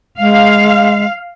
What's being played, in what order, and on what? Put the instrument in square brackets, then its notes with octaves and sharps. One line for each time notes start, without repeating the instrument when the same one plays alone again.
[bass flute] G#3 [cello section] F5